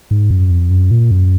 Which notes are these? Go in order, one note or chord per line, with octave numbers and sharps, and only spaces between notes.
G#2
F#2
F2
F#2
A#2
F#2